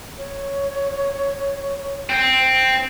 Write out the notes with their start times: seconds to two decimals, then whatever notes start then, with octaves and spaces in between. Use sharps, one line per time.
0.18 C#5
2.10 C4